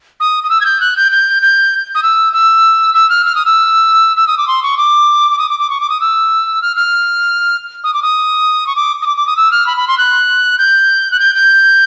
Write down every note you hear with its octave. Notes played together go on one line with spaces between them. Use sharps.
D#6
D#6
E6
G#6
G6
F#6
G6
G6
G6
D#6
E6
E6
E6
F6
F6
D#6
E6
E6
D#6
D6
C6
C#6
D6
D6
D#6
D6
D6
C#6
D6
D#6
E6
F6
F6
D#6
D6
D#6
C#6
D6
D#6
D6
D6
D#6
E6
F6
B5
B5
C6
F#6
G6
F#6
G6
G6